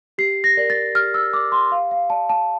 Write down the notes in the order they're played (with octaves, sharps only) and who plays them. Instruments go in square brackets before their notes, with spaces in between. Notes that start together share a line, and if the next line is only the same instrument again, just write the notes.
[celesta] G4 C7
A#6
A#4 D5
A6
G4 F6
E6
A#4 D5 D6
C6
G4 F5
F5
D5 A5
A5